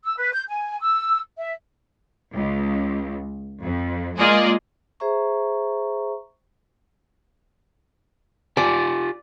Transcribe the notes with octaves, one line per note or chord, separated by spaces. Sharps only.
E6
B4
G6
G#5
E6
E5
C#2
F2
G#3 A#3 F4 G#4 D5 D#5
G#4 C5 E5 A#5 C#6
F4 G4 D5 G#5